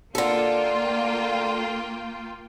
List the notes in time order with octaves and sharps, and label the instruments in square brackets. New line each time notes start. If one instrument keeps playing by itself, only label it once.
[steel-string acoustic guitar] D3 A4 [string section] A#3 F4 G5